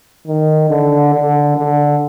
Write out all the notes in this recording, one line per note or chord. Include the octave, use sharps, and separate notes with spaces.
D#3
D3
D3
D3